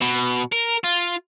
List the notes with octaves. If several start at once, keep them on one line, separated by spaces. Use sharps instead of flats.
B2
A#4
F4